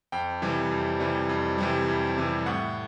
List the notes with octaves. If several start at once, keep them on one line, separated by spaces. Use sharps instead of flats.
F2 G5
C3 E3 G3
F2
C3 E3 G3
F2
C3 E3 G3
F2
C3 E3 G3
A2 F#5